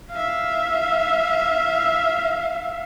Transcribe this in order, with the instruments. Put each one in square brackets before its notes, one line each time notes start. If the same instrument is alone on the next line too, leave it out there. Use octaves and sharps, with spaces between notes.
[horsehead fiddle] E5 F5